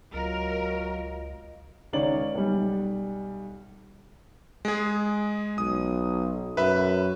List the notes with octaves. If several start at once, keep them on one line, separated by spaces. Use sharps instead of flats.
C#2 F#3 F4 A#4 D#5 F5
C#2 D#3 C#5 D5 F#7
B1 G3
G#3 G#4
B1 D#6
F#2 B4 E5 B5